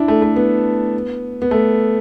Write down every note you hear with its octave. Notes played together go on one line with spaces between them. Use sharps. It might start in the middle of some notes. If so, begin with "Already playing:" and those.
Already playing: D4 E4
A3
A3
B3
B3
A3